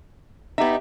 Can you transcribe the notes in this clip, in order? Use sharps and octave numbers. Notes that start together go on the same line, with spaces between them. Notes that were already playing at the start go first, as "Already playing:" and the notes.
B3 D#4 G4 E5